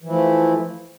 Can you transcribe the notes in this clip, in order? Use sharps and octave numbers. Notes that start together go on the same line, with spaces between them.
E3 F3 A3 E4